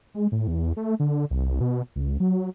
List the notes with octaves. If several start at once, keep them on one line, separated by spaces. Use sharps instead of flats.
G#3
A2
E2
A3
D3
C2
B2
C#2
F#3